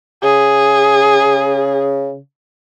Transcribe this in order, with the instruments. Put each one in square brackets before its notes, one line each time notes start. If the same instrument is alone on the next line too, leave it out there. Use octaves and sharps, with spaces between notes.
[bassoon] C#3 [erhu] G#4